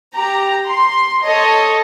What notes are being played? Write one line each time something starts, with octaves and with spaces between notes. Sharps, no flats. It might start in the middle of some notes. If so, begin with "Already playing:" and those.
G4 A#5
C6
A4 C#5 D#5